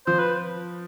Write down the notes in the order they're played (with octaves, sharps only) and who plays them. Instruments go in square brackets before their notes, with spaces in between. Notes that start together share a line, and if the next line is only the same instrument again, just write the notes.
[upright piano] F3 [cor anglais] C5
[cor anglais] B4